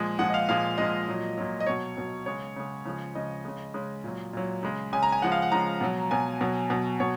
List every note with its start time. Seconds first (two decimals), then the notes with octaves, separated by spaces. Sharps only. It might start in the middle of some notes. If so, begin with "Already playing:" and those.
Already playing: A#2 F3 G#3
0.19 A#2 F3 G#3 F#5
0.30 D#5
0.34 F5
0.49 A#2 F3 G#3 F5
0.78 A#2 F3 G#3 D#5
1.08 A#2 F#3
1.38 A#2 F#3
1.60 D#5
1.66 B2 F#3 C#5
1.97 B2 F#3
2.26 C#3 G#3 C#5
2.56 C#3 G#3
2.85 C#3 F3 G#3
3.15 C#3 F3 G#3 D#5
3.45 C#3 G#3
3.74 C#3 G#3
4.04 A#2 F#3
4.33 A#2 F#3
4.63 C#3 G#3
4.92 C#3 G#3 G#5
5.03 A#5
5.12 G#5
5.22 C#3 F3 G#3 F#5
5.32 F5
5.42 F#5
5.52 C#3 F3 G#3 A#5
5.81 B2 F#3
6.11 B2 F#3 G#5
6.41 B2 F#3
6.70 B2 F#3
7.00 B2 F#3 C#5